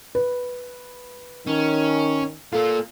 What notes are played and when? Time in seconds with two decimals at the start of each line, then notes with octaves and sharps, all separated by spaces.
0.15 B4
1.47 D#3 C#4
2.53 A#3 F4 A4